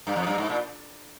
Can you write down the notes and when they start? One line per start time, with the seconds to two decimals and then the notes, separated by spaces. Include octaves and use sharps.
0.07 G2
0.16 F2
0.27 G2
0.38 G#2
0.49 A#2